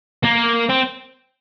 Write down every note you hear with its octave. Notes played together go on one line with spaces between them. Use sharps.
A#3
C4